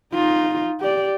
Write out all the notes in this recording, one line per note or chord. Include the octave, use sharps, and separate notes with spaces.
D#4 F4
G4 D5